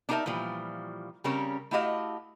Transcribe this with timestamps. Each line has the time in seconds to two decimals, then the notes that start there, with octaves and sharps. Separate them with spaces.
0.09 D4 D#4 G4 A#4 D5 E5
0.26 A#2 E3 F3 G3
1.24 C#3 G3 C4 C#4 A#4 C#5
1.71 A3 E4 F#4 G4 D#5 F5